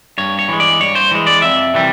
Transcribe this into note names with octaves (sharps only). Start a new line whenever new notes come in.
G2 C#5
C#5
E3 G#3
D5
G2 C#5
C5
E3 G#3
D5
F2 E5
C3 E3 G3